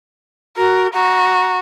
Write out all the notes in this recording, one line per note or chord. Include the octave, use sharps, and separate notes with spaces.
F#4 A#4
F#4 A#5